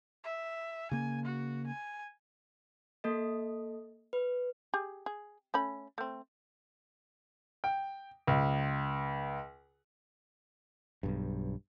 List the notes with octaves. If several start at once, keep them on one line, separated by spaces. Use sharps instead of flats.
E5
C#3 A#3 G#5
F#4
G#5
A#3 A4 D#5
B4
G4 G#4
G#4
A3 C#4 B5
A3 C4
G5
C#2
B1 G2